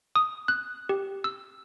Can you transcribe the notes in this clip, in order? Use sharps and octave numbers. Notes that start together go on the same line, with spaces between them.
D#6
F#6
G4
E6